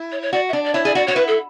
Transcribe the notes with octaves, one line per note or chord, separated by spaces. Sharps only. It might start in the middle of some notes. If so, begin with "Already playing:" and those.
Already playing: E4
C#5
C#5
F#4 D5
E5
D4 D5
D5
E4 C#5
G#4 D5
F#4 D5
F#4 C#5
E4 B4
A4